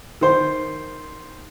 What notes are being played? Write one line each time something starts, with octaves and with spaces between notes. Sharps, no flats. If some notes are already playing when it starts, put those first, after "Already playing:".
D#3 C5